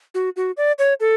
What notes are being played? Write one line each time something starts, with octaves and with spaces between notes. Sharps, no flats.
F#4
F#4
D5
C#5
A4